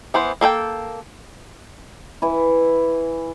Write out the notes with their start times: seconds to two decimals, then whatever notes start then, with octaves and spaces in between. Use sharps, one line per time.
0.14 E3 B3 C5
0.41 A#3 A4 A#4 G5
2.22 E3 E4